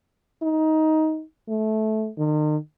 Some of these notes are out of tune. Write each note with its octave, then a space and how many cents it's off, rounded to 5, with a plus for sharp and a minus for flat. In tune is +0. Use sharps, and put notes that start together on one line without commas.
D#4 +15
A3 -15
D#3 -40